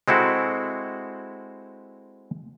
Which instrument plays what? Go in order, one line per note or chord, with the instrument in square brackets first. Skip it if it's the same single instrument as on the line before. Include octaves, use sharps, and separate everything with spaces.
[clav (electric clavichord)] G#3 C4 E4 F#4 A4